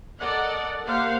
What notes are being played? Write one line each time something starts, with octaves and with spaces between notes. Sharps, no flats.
A4 A#4 D5 D#5 F#5
A#3 G4 C5 F5 F#5